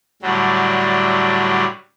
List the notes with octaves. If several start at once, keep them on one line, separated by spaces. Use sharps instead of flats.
A2 D3 F#3 G3